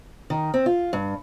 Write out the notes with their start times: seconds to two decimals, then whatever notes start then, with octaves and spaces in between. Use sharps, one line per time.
0.30 D#3
0.54 C4
0.66 F4
0.93 G2